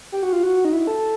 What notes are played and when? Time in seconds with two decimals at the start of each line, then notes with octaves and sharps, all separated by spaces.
0.12 G4
0.23 F#4
0.33 F4
0.43 F#4
0.65 D#4
0.73 E4
0.87 A4